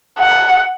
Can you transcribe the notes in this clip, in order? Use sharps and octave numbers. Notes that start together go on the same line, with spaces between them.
F#5